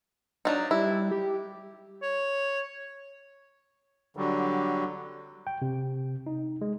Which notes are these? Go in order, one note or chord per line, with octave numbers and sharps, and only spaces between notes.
F#3 D4 D#4
G3 E4
G4
C#5
D3 F#3 G3
G5
C3
D#4
G#3